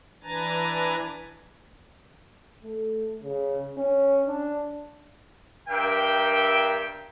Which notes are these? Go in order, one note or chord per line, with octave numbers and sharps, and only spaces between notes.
E3 D4 B4 G#5 A#5 A6
A3
C#3
C#4
D4
G2 A#4 E5 G5